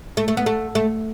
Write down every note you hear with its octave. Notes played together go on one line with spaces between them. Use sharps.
A3
A3
B3
A3
A3